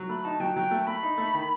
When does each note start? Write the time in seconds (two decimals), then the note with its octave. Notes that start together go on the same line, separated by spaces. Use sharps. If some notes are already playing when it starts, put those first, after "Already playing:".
Already playing: F#3
0.09 A3 B5
0.24 D#4 A5
0.40 F#3 G5
0.56 F#3 G5
0.71 A3
0.87 A3 B5
1.03 D#4
1.18 A3
1.34 D#3